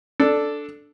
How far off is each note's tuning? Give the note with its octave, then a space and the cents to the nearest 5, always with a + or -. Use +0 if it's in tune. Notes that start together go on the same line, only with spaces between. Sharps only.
D4 +0 A4 +0